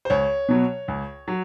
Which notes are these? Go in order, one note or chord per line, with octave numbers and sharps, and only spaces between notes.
C5
C#2 C#5
B2 F#3
C#2
F#3